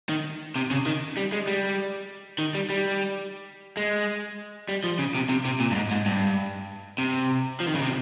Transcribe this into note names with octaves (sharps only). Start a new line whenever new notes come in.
D#3
C3
C#3
D#3
G3
G#3
G3
D#3
G3
G3
G#3
G3
F3
C#3
C3
C3
C3
A#2
G2
G#2
G#2
G2
C3
F3
D#3
C#3
C3